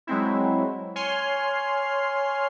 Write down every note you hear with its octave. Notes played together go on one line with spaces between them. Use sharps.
F#3 G#3 C4 E4
C#5 G#5 C6 F6 C7